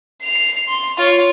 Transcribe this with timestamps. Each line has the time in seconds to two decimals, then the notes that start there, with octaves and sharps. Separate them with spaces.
0.22 C7 F7
0.69 C6
0.98 F4 C#5